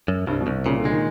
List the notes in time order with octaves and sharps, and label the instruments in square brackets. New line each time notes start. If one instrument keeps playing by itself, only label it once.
[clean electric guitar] F#2
[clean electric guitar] C2 [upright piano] G2
[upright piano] B2
[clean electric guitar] C2
[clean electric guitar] A#2 [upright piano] C#3
[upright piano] D3
[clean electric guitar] G#3
[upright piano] D#3